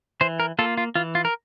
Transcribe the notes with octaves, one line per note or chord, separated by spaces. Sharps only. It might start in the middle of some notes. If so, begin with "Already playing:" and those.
E3 C5
A#4
A#3 F4 A4
F4
E3 F4
F4
A#4